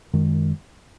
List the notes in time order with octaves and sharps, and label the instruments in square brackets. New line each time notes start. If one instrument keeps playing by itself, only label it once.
[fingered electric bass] F#2 D#3 G#3